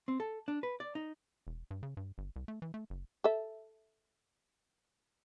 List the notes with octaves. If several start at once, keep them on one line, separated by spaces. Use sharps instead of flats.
C4
A4
D4
B4
D5
D#4
E1
G2
C#3
G2
G1
C2
A3
E3
A3
F#1
A4 E5